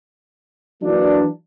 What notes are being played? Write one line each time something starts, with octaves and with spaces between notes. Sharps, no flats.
E3 F#3 A#3 D4